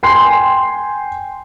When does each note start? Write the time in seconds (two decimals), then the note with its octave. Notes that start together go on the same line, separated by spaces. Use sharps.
0.03 G5 G#5 C6 C7